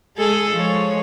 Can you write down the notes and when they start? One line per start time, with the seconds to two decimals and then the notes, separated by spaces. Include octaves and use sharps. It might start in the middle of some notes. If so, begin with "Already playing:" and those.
0.17 G#3 G#4 A4
0.51 F3 G#3 C#5